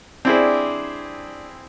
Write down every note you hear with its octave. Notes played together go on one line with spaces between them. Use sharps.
G3 C4 D4 E4 G#4